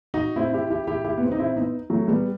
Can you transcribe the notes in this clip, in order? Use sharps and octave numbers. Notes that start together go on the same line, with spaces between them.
D#4 F#4
C4 E4
E4 G4
E4 G4
E4 G4
E4 G4
B3
C4
D#4
C4 E4
B3 D#4
F#3 A3
G3 B3